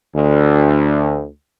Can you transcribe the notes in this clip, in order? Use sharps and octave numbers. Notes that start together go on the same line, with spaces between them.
D2